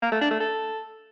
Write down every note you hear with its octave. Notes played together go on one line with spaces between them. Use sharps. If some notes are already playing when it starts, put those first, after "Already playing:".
A#3
A3
D4
A3
A4